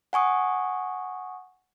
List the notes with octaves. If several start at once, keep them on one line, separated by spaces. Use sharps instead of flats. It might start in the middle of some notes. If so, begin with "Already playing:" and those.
F#5 G#5 C#6 D#6